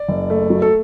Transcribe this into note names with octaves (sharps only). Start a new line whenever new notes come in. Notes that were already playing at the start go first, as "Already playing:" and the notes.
Already playing: D5
F#1
A3
F#3
A4